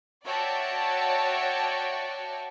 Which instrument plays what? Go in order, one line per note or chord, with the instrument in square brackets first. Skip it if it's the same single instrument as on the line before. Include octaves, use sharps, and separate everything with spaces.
[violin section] F#4 C#5 D5 E5 G5 A5